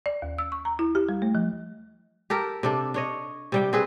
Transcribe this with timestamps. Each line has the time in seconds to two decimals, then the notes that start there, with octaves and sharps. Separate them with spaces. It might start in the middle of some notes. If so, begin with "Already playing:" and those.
0.06 D5
0.22 D#2
0.38 E6
0.52 C#6
0.65 A#5
0.79 E4
0.95 G4
1.09 G3
1.22 A3
1.35 F3
2.30 G4 A4 A#4
2.63 C3 D4 A4
2.94 D4 C#5 D#5
3.52 C3 G3 G5
3.73 C4 G#4 B4